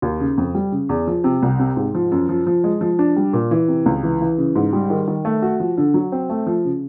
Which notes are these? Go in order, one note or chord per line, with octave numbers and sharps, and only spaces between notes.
D#2
C#3
F2
G3
C#3
E2
F3
C3
C2
C3
G#2
F3
F#2
F3
F3
G#3
F3
D4
G3
A#2
E3
C3
C#2
E3
E3
C#3
G#2
G3
D#3
D#3
A3
F#4
F3
D3
F#3
C4
A3
F3
C#3